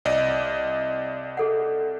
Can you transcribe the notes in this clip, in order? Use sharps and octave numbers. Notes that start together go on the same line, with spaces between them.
C2 D5 D#5
G#4 A4 F#5